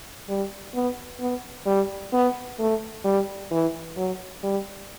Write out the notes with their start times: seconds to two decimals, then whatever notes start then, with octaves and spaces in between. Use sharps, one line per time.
0.29 G3
0.75 B3
1.20 B3
1.66 G3
2.13 B3
2.59 A3
3.05 G3
3.51 E3
3.97 F#3
4.43 G3